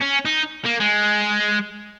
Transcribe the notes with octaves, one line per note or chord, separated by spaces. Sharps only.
C#4
D#4
A#3
G#3